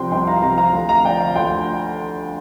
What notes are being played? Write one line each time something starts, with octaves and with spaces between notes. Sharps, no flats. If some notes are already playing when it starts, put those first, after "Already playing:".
Already playing: C2 C3 F3 G5 C6
C2 G5 C6
F5 A#5
C3 F3 F5 A#5
F5 A#5
D2
F5 A#5
D3 F3 D5 G5
F5
D2 G5 C6